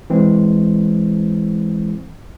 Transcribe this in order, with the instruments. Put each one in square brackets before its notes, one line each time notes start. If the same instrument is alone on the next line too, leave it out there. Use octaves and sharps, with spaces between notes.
[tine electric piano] E3 G#3 C4